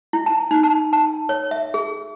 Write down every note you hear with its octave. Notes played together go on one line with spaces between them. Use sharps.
E4
A5
D#4
A5
A5
C#5
E5
G#4